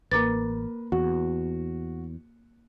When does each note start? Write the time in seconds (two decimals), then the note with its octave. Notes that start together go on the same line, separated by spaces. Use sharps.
0.12 A1 A#3 A#4 B4 D6 A6
0.92 E2 F#4